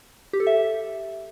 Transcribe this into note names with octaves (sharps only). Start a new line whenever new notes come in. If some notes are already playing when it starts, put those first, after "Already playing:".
G4
A4
E5